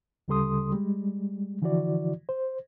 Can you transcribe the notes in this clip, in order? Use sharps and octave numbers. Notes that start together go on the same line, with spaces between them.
D2 C#3 G3 A4 C6 D#6
G3 G#3
D3 E3 F3 E4 F#4 D5
C5